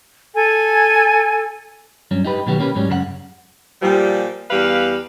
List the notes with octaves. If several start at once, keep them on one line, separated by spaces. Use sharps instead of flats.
A4 G#5
G2 F#3 C#4
D#4 G4 B4
B2 D#3 F#3 B3 G4
A#3 C#4 G4 A#4 B4
G#2 F#3 G3 C#4
F#2 C#3 A4 F#5
A#2 F3 G3
E2 G3 B4 F5